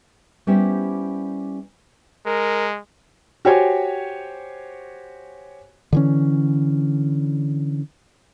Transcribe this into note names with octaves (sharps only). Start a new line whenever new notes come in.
G3 B3 C#4 E4 G4 C5
G#3 A#4
F#4 G4 C5 C#5 G#5
D3 E3 C#4